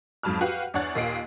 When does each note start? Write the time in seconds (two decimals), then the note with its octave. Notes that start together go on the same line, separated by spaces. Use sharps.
0.23 F2 G#2 F#3 A5 B5 F6
0.41 F#4 G4 B4 F5 F#5
0.74 E2 D4 C#5 F#5 F#6 A6
0.95 D#2 A#2 D#5 C7 D7